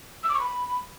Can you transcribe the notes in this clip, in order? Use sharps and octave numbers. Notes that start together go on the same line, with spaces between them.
E6
D6
C#6
B5